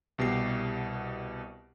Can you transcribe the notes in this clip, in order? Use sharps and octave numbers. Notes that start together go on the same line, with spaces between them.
C2 B2 G4 C7